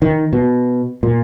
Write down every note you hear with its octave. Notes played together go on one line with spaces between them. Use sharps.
D#3
B2
A#2